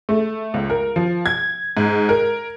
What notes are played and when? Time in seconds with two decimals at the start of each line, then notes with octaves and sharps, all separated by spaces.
0.09 A3
0.54 C#2
0.70 A#4
0.96 F3
1.26 G#6
1.77 G#2
2.09 A#4